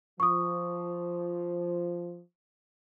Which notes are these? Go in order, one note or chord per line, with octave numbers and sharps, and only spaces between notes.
F3 C#6 D#6